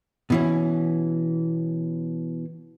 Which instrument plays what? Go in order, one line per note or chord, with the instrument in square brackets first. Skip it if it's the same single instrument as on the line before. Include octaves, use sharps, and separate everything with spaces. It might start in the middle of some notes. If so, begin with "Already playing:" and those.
[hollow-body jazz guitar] B2 E3 C#4